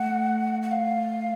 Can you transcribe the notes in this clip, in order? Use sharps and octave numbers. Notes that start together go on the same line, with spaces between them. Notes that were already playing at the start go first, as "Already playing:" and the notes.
Already playing: A3 F#5
F#5
F5